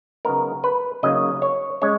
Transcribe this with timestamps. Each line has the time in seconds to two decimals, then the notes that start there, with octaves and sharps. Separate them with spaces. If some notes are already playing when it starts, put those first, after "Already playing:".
0.25 C#3 F#3 B3 D#4 A#4
0.64 B4
1.03 C#3 F#3 A#3 D#4 D#5
1.42 C#5
1.82 G#3 C#4 C#5